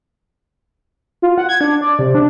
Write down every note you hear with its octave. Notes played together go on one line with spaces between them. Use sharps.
F4
F#5
G#6
D4
D5
C3
D4